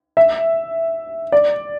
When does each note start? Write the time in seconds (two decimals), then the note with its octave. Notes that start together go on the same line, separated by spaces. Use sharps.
0.17 E5
1.32 D5